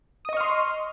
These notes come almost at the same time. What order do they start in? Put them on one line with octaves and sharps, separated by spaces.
D#6 D#5 C#6 F6 C6